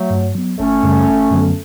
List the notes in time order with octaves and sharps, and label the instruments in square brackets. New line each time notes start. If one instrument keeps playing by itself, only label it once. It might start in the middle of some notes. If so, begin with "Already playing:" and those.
Already playing: [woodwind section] F#3 A3
[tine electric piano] G2
F#3 B3
[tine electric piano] G1 [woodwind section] A3 C#4
[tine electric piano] F#2 C#3 G3
G1
F#2 D3 F#3 B3